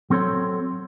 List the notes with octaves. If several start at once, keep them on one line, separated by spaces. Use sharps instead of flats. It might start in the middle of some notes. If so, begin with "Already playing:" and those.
F#3 C4 A4 C#5 C6